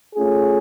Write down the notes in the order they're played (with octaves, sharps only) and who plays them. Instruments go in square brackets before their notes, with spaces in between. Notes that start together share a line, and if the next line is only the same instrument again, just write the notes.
[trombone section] A3 C#4 F4 G#4